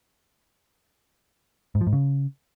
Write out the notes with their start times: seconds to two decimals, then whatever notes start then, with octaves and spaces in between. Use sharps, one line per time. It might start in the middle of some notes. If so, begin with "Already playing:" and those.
1.75 G#2
1.81 F3
1.87 G#2
1.93 C#3